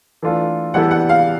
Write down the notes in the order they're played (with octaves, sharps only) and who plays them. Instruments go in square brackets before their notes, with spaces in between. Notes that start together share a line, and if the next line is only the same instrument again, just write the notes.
[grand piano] E3 A3 D4 F4 A4
[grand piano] E3 G3 B3 E4 A4 [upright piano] F#5
[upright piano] F#5
F5